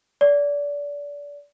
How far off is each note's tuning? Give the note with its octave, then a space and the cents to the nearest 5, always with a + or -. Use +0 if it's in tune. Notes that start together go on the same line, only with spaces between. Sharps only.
D5 -25